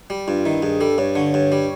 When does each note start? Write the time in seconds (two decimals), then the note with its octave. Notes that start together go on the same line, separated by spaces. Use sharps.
0.10 G3
0.28 G2 F4
0.45 D#3 E4
0.63 G2 G#4
0.81 G3 A4
0.98 G2 C#5
1.15 D3
1.34 G2
1.52 G3